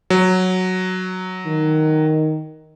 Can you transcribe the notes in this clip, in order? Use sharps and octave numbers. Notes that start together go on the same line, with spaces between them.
F#3
D#3